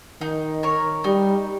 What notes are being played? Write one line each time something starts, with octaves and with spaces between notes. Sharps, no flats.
D#3 D#4
A#4 C#5
G3 D#4